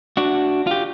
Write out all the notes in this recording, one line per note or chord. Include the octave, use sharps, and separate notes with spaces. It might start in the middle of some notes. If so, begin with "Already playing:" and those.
D4 F#4
F4 G4